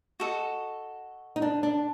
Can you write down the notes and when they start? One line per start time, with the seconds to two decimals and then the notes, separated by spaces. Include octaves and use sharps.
0.20 F#4 A4 D#5
1.36 D#4
1.42 D4
1.63 D4